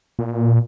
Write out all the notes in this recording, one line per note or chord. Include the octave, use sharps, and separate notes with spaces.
A#2